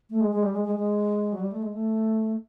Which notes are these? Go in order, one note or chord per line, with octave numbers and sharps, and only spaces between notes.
A3
G#3
G#3
G3
G#3
G#3
G#3
F#3
G3
A3
G#3
A3